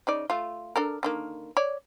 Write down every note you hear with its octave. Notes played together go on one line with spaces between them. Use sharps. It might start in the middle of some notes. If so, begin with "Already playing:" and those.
C#3 D#4 D5
A3 F4
D4 A4 A#4
D3 D#3 A#3
C#5 D5